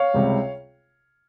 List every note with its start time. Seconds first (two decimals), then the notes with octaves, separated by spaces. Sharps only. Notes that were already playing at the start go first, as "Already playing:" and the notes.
Already playing: C#5 F5
0.14 C#2 C3 G3